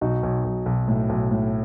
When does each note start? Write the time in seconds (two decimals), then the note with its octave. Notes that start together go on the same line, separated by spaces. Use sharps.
0.01 B1 D#4 F#4
0.23 B1
0.45 B1
0.66 B1
0.88 A2
1.09 B1
1.31 A2